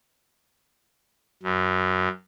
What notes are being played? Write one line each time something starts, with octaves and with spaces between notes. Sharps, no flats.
F#2